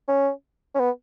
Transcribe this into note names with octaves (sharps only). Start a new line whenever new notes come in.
C#4
C#4
B3